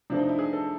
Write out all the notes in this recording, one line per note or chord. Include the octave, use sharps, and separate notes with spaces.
C3 F3 A3 D4
D#4
E4
G#4
A4